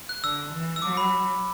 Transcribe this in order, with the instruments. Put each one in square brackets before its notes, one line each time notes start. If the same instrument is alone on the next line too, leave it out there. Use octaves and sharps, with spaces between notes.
[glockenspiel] F#6
[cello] D3 [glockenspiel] E6
[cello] E3
[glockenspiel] E6
[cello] F#3 [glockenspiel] D6
[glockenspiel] B5